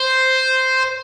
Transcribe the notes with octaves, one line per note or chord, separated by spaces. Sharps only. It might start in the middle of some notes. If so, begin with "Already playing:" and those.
Already playing: C5